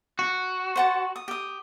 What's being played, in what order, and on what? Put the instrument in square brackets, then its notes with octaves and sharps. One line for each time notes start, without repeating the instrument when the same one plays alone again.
[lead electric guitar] F#4
[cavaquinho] C5 F#5 A5
D#6
G4 D#6